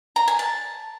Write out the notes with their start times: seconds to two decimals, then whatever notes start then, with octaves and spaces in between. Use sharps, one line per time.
0.16 A#5
0.28 G#5
0.39 A5